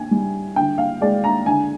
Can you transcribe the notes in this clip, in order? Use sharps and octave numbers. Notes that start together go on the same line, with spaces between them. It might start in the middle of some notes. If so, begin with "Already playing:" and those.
Already playing: G5 G#5
G3
D3 G5
F5
G#3 D5
A#5
D3 G#5